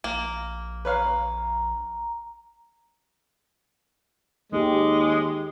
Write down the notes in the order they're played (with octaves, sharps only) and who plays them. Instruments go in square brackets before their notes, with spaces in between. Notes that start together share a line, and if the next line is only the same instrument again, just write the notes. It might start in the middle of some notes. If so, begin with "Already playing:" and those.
[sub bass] A#1 [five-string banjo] A#3
[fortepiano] B4 C#5 F5 [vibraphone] A#5
[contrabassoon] D#2 [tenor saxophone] G#3 [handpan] G4 A4